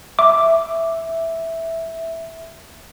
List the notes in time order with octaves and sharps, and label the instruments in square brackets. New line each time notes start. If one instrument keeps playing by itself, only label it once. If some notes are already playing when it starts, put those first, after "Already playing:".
[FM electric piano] E5 [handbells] D6